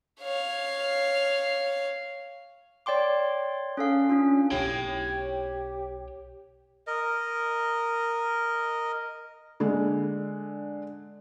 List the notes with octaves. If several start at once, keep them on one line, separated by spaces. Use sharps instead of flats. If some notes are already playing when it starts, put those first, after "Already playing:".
C#5 F5
C#5 D5 G5 C6 D6
C#4 A4 F5
C#4 D4 F4
B1 G4 C#5 G5
A#4 D#5
D3 G#3